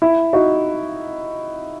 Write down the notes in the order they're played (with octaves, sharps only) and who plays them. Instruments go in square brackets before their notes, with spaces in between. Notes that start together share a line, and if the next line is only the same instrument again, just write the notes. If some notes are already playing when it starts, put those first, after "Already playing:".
[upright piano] E4
D#4 F#4